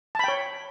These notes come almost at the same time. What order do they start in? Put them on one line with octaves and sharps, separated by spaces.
A5 B5 G5 C#5